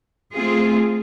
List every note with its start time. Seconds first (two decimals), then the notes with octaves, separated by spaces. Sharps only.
0.35 A3 C4 F4 G#4